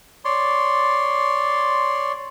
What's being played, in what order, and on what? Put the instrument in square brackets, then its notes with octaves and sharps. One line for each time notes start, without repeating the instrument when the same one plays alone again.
[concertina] C#5 D5 C6